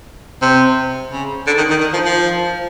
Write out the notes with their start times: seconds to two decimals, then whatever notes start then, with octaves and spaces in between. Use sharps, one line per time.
0.42 C3
1.12 C#3
1.47 D3
1.57 D#3
1.70 D#3
1.80 D#3
1.93 F3
2.05 F3